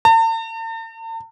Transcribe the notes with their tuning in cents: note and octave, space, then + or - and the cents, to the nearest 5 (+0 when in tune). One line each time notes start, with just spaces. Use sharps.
A5 +45